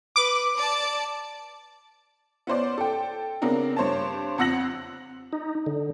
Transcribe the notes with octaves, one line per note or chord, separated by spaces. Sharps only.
B4 D6
D5 A5
B3 C#4 C5 D5
A4 G5
C#3 B3 C4 D4 A#4
G2 C5 C#5 A5
F2 C4 F#5 E6 A#6 F#7
D#4
D3